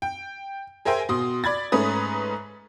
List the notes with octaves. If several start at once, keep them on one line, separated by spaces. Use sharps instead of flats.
G5
G#4 A#4 C5 E5 G5 G#5
B2 C6 D#6
D5 B5 G#6 A6
G#2 A3 C#4 B4 D#6